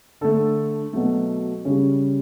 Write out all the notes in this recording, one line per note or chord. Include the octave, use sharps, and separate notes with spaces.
D3 A3 A4
B2 F#3 A3
C#3 G3 C#4